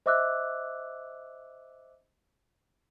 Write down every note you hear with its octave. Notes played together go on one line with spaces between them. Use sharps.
C5 D#5 E5 D6 E6 F#6